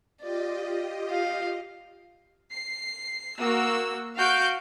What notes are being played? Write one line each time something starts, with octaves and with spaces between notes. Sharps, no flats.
F4 G4 D5 D#5
F5
C7
A#3 F#4 E6
F#4 F5 G6 D7